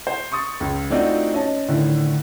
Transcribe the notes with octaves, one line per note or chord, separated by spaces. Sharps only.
C5
C6 C#6 D#6 A6
C#2
A3 C4 D4 D#4 F4 F#4
C#4 D#5 A5
A2 D3 D#3